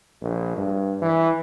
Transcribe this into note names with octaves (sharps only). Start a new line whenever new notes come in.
A#1
G2
E3